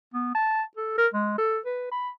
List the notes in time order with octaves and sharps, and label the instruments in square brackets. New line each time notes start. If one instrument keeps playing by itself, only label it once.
[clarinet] B3
A5
A4
A#4
G#3
A4
B4
B5